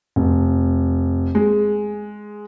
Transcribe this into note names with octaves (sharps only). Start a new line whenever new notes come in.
F1
G#3